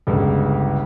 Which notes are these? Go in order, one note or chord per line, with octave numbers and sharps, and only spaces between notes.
G1 C#2